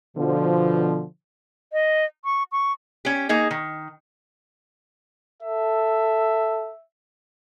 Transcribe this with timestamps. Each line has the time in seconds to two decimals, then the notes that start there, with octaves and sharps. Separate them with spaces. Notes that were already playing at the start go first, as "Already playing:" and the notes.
0.17 B2 D3 F3
1.73 D#5
2.25 C#6
2.52 C#6
3.05 C#4 G4
3.29 A#3 D#4 G#4
3.51 D#3
5.43 A4 E5